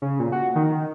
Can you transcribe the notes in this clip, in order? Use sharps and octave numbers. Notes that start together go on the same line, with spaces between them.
C#3
A#2
F#4
D#3